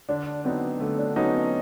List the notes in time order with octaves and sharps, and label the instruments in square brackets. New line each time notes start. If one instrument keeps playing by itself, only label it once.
[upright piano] D3 [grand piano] D4
[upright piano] F#3 B3 D#4 [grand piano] C4
[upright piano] D3 [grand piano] A3
[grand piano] D4
[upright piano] F#3 B3 D#4 [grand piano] C#4
[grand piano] C4